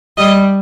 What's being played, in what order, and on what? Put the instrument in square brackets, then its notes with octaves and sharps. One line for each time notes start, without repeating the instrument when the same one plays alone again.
[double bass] G3 [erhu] D#5